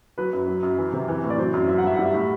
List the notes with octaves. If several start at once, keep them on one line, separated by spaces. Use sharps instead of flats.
F#3 B4
F#2
F#3
F#2
E3
C3
E3
A2
D5
F#3 C5
F#2
F#3 E5
F#5
G2 E5
G3 F#5
E5
A2